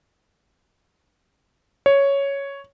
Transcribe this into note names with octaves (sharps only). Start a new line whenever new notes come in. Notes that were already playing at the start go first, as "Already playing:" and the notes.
C#5